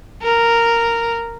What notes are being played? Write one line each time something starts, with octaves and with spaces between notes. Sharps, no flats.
A#4